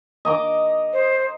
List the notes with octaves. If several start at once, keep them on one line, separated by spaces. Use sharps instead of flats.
D#5 A#5 D6
C5